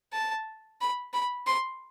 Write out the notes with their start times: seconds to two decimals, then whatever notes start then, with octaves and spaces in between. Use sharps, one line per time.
0.13 A5
0.80 B5
1.13 B5
1.47 C6